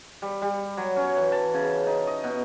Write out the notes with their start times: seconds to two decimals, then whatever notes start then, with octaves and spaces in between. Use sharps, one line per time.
0.22 G3
0.42 G3
0.77 F#3
0.96 C#4
1.17 E3
1.32 A5
1.54 C#3
1.87 D#4
2.07 D#5
2.24 B2